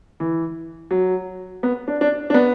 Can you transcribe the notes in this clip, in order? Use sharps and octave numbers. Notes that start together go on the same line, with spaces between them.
E3
F#3
B3
D4
D4
D4
B3